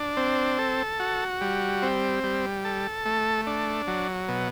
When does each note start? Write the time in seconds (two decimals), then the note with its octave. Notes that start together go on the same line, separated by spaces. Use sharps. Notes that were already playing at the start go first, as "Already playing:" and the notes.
Already playing: D4
0.17 C4
0.59 A4
1.00 F#4
1.41 G3
1.82 C4
2.24 G3
2.65 A4
3.05 A3
3.47 D4
3.87 F#3
4.28 B2